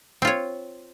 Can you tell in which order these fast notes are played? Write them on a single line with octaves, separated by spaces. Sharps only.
C4 F4 C#5